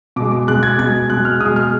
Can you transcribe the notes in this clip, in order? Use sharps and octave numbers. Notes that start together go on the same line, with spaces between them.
B2 G#3 D6
D6
B2 G#3 F#6
G#6
B2 G#3 G#6
B2 G#3 F#6
F6
B2 G#3 D#6
F6